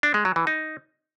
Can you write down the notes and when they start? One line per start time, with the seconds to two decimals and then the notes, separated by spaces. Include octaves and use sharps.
0.03 D4
0.14 G#3
0.25 F#3
0.36 E3
0.47 D#4